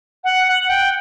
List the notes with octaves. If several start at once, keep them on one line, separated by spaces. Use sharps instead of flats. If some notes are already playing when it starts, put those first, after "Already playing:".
F#5
F#5
G5